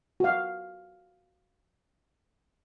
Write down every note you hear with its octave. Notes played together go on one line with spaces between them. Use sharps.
F#4 F5